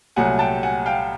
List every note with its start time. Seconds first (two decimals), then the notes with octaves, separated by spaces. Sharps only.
0.16 C2 A#2 F#3 A3 F#5 G#5
0.39 G5 A5
0.63 F#5 G#5
0.86 F5 G5